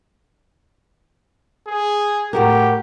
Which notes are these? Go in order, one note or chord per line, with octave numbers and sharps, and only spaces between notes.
G#4
A2 F#4 G4 A#4